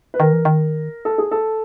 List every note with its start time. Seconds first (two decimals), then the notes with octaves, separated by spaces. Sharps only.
0.14 B4
0.20 D#3 A#4
0.33 E3
0.45 D#3
1.05 A4
1.18 G#4
1.31 A4